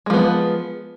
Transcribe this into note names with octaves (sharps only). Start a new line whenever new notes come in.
F3 G#3 B3